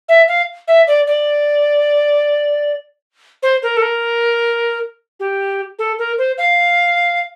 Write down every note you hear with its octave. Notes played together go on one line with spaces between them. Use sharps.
E5
F5
E5
D5
D5
C5
A#4
A4
A#4
G4
A4
A#4
C5
F5